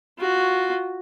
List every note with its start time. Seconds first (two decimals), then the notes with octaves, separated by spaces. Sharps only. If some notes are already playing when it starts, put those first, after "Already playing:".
0.18 F4 F#4